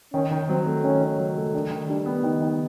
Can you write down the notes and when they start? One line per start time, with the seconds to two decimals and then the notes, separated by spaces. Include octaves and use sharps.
0.13 D#3 C#4
0.31 D#3
0.48 F#3 C4
0.66 A3
0.83 D#3 C#4
1.01 D#3
1.18 F#3
1.36 A3
1.53 D#3 D4
1.71 D#3
1.88 G3 D4
2.06 B3
2.24 D#3 D#4
2.41 D#3